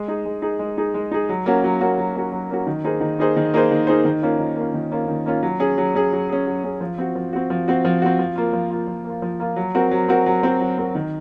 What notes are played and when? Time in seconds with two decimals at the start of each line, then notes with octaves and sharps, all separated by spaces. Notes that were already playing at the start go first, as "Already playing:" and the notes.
Already playing: G#3
0.08 D#4 G#4
0.25 G#3
0.42 D#4 G#4
0.59 G#3
0.78 D#4 G#4
0.94 G#3
1.11 D#4 G#4
1.29 F#3
1.46 A#3 C#4 F#4
1.64 F#3
1.81 A#3 C#4 F#4
1.98 F#3
2.15 A#3 C#4 F#4
2.32 F#3
2.50 A#3 C#4 F#4
2.67 D#3
2.84 A#3 D#4 G#4 C5
3.01 D#3
3.19 A#3 D#4 G#4 C5
3.36 D#3
3.54 A#3 D#4 G#4 C5
3.71 D#3
3.87 A#3 D#4 G#4 C5
4.05 D#3
4.22 A#3 C#4 F4
4.39 D#3
4.56 A#3 C#4 F4
4.74 D#3
4.92 A#3 C#4 F4
5.08 D#3
5.26 A#3 C#4 F4
5.43 F#3
5.60 C#4 G#4
5.78 F#3
5.95 C#4 G#4
6.12 F#3
6.29 C#4 G#4
6.46 F#3
6.64 C#4 G#4
6.81 F3
6.98 C4 F#4
7.15 F3
7.33 C4 F#4
7.50 F3
7.68 C4 F#4
7.85 F3
8.02 C4 F#4
8.19 F3
8.36 A#3 F4
8.53 F3
8.70 A#3 F4
8.87 F3
9.05 A#3
9.10 F4
9.22 F3
9.40 A#3 F4
9.56 F#3
9.75 C4 F#4 A#4
9.91 F#3
10.08 C4 F#4 A#4
10.26 F#3
10.43 C4 F#4 A#4
10.60 F#3
10.78 C4 F#4 A#4
10.95 D#3